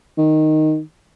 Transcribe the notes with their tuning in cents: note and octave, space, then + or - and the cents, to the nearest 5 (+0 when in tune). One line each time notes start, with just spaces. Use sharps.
D#3 -5